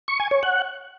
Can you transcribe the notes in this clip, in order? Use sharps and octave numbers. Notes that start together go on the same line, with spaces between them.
C#6
G#5
C#5
F#5